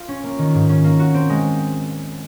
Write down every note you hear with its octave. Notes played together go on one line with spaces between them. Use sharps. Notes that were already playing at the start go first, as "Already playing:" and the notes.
Already playing: F4
C#4
A#3
D#3
G#2
C#4
A#3
F#4
C4
G#3